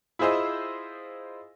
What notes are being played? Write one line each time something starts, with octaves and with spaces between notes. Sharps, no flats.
E4 F4 G#4 C5 D#5 E6